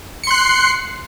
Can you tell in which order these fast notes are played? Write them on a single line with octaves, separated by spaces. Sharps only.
C#7 C6 F#6 C7